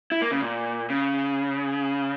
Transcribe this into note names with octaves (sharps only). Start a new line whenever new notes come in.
E4
A#3
C#3
A#2
C#3